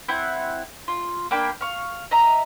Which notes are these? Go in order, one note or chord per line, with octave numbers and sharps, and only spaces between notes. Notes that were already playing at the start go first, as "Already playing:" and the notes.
C4 E4 F#5
F4
A#3 D4 G5 B5
F5 C#6
D#5 E5 A#5